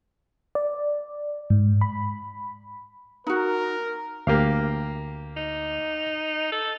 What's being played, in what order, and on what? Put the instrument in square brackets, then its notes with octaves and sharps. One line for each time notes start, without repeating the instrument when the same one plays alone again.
[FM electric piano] D5
G#2
B5
[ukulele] D#4 F#4 [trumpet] A#4
[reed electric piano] D2 [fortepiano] A#3 G4 F5
[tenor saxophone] D#4
A4